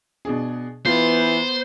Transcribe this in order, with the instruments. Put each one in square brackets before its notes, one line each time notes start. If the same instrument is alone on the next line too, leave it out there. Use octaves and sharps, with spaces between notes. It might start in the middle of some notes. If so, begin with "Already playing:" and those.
[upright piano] B2 D4 G#4
[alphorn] E3 [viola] B3 [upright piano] F4 [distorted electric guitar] C5